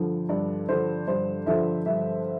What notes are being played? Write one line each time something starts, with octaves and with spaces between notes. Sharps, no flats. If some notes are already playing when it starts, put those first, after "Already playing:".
Already playing: G2 D3 F3
G2 D5
D3 F3 C5
G2 C5
D3 F3 E5
G2 E5